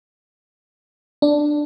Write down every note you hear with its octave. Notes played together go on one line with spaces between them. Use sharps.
D4